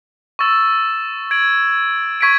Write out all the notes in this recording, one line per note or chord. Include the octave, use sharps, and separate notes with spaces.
C#6 E6 A6 E7
G#6 D7 F#7
C#6 G#6 B6 D7